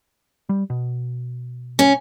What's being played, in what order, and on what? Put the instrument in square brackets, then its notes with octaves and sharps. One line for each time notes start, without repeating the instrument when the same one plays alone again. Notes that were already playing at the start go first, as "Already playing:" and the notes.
[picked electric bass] G3
B2
[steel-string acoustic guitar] C#4